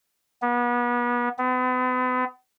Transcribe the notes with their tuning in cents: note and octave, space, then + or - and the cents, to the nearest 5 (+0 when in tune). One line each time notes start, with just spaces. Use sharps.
B3 -35
B3 +40